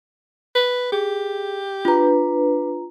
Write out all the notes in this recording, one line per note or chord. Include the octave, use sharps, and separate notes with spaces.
B4
G4 G#4
D4 F4 B4 A#5